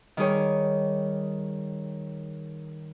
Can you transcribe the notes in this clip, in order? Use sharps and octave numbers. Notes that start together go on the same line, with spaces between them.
D#3 G3 G#4 C#5